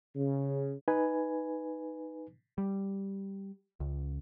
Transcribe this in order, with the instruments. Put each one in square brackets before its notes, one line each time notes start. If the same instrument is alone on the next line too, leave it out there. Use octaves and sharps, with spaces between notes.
[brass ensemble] C#3
[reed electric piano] D#4 B4 G#5
[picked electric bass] G3
C#2